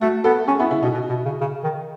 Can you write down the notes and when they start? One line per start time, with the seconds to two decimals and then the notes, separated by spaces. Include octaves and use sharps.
0.01 A3 F#4
0.24 B3 A4
0.47 C#4 G#4
0.59 B3 E4
0.71 C#3 E4
0.83 B2 D#4
0.94 B2
1.09 B2
1.25 C#3
1.41 C#3
1.64 D#3